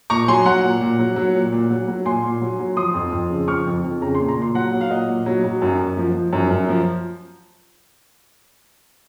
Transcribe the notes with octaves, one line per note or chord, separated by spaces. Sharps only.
A#2 A#5 C#6
F#3 G#5 C6
F#3 F#5 A#5
A#2
A#2
F#3
F#3
A#2
A#2
F#3
F#3
A#2 G#5 C6
A#2
F#3
F#3
F3 C6 D#6
F2
F2
C#3
F3 C#6 F6
F2
F2
C#3 A#5
A#2 C6
A#5
A#2 C6
F#3 F#5 A#5
F#3
F5
A#2 D#5 F#5
A#2
F#3
F#3
F#2
F#2
F3
F3
F#2
F#2
F3